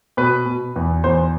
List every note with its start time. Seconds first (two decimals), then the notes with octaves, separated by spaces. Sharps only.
0.17 B2 B4
0.46 B2
0.76 E2
1.04 E2 C5